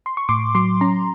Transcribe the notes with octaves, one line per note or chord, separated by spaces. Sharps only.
C6
C#6
A2 C6 D6
F#3 C6 D6
C#4 A#5 C6